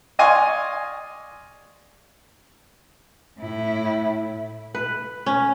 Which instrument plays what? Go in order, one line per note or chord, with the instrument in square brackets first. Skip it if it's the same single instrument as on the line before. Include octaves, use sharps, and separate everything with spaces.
[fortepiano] D5 D#5 F5 G#5 C6 C#6
[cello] A2 E4
[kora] B4
C#4